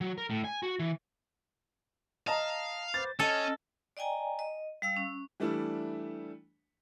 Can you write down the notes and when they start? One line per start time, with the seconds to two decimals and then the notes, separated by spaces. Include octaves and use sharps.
0.01 F#3
0.18 A#4
0.30 A2
0.45 G#5
0.63 F#4
0.79 E3
2.27 D#5 F5 A5 A#5
2.94 B4 C5 D6 A6
3.19 C#4 A4 D#5 F6
3.97 D5 D#5 G5 G#5 A#5
4.39 D#5
4.82 G3 F5 E6
4.97 C#4
5.40 E3 G3 A3 D4 E4